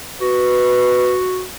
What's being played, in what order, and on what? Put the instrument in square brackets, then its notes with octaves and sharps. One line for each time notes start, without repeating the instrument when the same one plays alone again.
[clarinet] F#4 [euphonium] B4